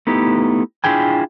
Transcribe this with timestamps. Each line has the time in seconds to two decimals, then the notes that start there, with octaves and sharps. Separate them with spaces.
0.07 A3 B3 D#4 E4 G4
0.84 D4 E4 F4 G#4 G5 G#5